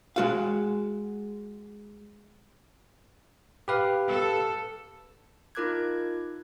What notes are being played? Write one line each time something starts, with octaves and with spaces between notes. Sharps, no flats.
G#3 F#4 F5
G4 B4 F5
A4
D#4 F4 A#4 D6 F#6 G#6